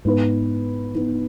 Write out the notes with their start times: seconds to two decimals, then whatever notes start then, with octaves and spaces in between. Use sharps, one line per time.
0.05 G#2 B3 D#4 B4
0.95 B3 D#4 B4